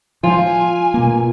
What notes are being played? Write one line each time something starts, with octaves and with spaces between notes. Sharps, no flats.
F3 F4 G#5
B2 A#3